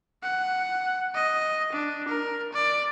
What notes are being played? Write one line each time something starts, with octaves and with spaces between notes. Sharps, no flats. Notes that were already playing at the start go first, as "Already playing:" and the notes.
F#5
D#5
D4
A#4
D5